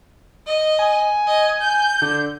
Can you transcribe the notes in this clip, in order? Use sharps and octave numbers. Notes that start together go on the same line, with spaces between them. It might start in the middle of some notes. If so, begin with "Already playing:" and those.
D#5
G#5
D#5
G6
D3